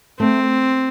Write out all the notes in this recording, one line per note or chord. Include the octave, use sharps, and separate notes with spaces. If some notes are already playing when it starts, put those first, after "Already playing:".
A3 C4